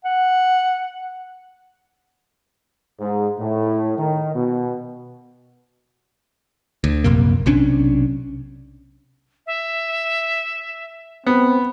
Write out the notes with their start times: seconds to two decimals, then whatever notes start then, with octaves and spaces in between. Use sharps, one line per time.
0.05 F#5
3.00 G#2
3.39 A2
3.98 D#3
4.34 B2
6.84 D2
7.04 A#1 F#2 C3 A#3
7.46 B1 C3 C#4 D4
9.46 E5
11.27 B3 C4